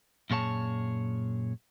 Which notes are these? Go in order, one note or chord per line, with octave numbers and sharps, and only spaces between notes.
F#2 A#2 G#4 C#5 A5